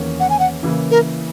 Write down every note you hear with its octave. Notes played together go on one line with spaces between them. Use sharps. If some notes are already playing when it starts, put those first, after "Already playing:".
Already playing: E2 D#3 A#3 C#4
F#5
G#5
F#5
C#3 E3 A#3 E4
A#4